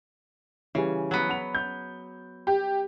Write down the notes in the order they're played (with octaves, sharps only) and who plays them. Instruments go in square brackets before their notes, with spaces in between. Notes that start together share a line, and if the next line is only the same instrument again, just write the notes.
[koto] C#3 [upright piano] E3 G3
[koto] F#3 B3
[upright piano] F#5 B5 F7
G6
[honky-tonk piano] G4